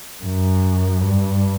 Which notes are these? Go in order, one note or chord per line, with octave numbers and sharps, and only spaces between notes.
F#2
G2